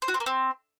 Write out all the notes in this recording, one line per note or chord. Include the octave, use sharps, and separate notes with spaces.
C5
F#4
C4
A#3
C4